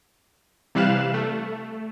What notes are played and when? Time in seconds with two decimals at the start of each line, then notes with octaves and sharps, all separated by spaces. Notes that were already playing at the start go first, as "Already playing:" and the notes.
0.75 C3 E3 G3 F5 F#6 E7
1.14 A3